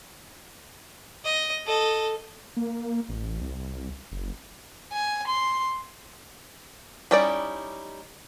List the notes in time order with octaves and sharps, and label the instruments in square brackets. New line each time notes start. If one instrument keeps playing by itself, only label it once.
[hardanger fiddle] D#5
A4 D#5
[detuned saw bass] A#3
A1
C2
F#1
[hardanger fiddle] G#5
C6
[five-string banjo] G3 C#4 D#4 E4 D5